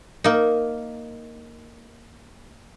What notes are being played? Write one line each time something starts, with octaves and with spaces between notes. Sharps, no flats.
A#3 D#4